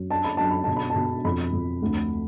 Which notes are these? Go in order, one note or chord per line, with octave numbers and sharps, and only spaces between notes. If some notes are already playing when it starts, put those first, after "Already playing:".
Already playing: F#2
D4 A5
B5
F#2 A5
B5
B2 A5
B5
A5
B2
F2 B5
F2
D2